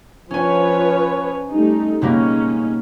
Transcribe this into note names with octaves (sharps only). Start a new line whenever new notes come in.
F3 C#4 B4 C#5 G#5
G3 A3 D#4
B2 G3 G#3 A#3 C#4 D#4